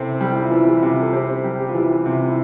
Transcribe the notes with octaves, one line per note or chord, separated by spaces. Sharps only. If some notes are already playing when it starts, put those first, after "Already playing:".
Already playing: C3 E3 C4 A4
G3
E4
F4
E3
G4
C3
F4
A4
C4 G4
G3
G4
F4
E3 G4
C3 F4
E4